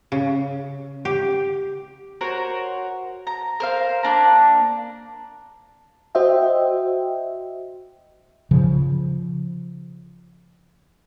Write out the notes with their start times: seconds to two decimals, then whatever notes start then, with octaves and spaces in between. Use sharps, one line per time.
0.12 C#3
1.05 G4
2.21 F#4 A#4 C5 C#5
3.27 A#5
3.60 A#4 C5 F5
4.03 A#3 D4 A#5
6.15 F#4 C5 D#5 E5 G5
8.51 C#3 F3